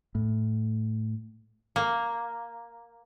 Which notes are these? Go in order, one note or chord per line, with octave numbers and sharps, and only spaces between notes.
A2
A#3